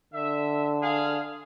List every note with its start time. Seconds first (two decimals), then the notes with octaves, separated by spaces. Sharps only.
0.14 D3 E5
0.82 G#4 F5